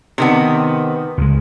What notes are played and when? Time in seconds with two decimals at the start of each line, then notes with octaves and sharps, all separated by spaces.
0.18 C3 D#3 B3
1.18 C#2 G#3